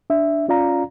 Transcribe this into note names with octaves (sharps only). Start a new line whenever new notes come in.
D4 E5
C#4 F4 D5 F5 A#5